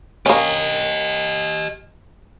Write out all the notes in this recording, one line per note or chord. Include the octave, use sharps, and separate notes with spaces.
A#3 C#4 G4 D#5